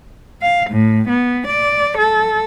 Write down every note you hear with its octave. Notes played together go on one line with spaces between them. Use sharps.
F5
A2
B3
D5
A4